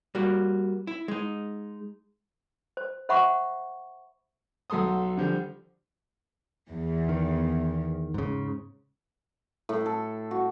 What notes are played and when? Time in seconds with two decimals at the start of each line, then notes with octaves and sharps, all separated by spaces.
0.15 G3 A#3 F#4
0.87 E4
1.08 G#3 D#4
2.77 C5
3.09 C5 E5 F#5 B5 C#6 D6
4.70 B1 F#3 A4 C6 D#6
5.17 D3 F3 G3
6.70 E2
7.09 D#3
8.14 G#2 C#3
9.69 A2
9.86 A4
10.31 F#4